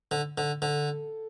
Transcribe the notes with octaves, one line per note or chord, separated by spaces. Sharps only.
D3
D3
D3 A4